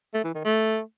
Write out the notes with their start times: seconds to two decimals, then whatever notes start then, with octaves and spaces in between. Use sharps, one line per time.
0.14 A3
0.24 E3
0.34 D#3
0.45 A3